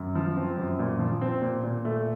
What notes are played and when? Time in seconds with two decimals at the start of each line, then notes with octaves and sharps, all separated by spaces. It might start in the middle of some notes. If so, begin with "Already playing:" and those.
Already playing: F#2
0.15 F3
0.37 C4
0.57 F#2
0.79 A#2
0.99 F3
1.21 C4
1.42 A#2
1.63 A#2
1.85 A3